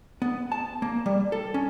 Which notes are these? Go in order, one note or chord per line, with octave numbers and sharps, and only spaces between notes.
B3
A5
A#3
G3
A4
C#4